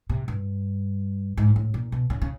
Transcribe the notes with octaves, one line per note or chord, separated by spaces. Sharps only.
C3
G2
G#2
A2
A#2
B2
C#3
C#3